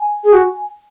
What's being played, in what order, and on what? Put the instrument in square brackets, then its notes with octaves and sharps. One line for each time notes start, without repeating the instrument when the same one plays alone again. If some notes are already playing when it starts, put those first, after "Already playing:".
Already playing: [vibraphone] G#5
[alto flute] G#4
F#4